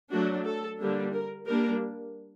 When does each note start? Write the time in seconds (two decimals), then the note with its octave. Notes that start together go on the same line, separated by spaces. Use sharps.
0.11 F#3 A3 D4 F#4
0.44 A4
0.79 D3 G3 A#3 D4
1.12 A#4
1.46 G3 A#3 D4 A#4